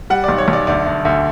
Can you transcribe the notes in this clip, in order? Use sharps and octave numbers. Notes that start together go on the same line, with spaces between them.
G3 F#5
B1 D5
C#5
B1
D5
D2 D5
D2
D2